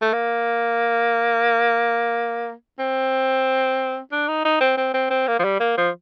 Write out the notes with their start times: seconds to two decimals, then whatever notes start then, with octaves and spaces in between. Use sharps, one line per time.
0.02 A3
0.13 A#3
2.79 C4
4.12 D4
4.28 D#4
4.45 D#4
4.61 C4
4.77 C4
4.94 C4
5.11 C4
5.28 A#3
5.39 F3
5.44 G3
5.60 A#3
5.78 F3